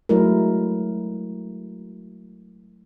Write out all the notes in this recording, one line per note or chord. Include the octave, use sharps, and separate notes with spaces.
F#3 G#3 A3 E4 A#4